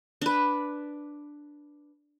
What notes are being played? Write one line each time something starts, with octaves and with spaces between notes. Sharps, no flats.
D4 B4